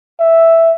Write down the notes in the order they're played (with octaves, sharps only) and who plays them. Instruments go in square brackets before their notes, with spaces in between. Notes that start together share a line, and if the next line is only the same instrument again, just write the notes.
[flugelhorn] E5